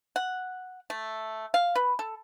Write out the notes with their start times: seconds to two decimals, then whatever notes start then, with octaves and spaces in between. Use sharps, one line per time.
0.16 F#5
0.90 A3
1.54 F5
1.75 B4
1.99 A4